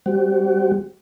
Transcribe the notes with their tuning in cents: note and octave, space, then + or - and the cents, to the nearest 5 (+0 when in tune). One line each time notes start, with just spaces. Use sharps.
G3 +0 C4 +0 F#4 +35